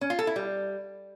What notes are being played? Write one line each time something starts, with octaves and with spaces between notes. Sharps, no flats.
C#4
F4
A4
E4
G3